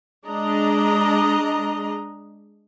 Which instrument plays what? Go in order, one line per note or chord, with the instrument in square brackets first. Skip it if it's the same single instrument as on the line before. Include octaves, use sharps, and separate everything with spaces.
[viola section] G#3 D4 D#5 A#5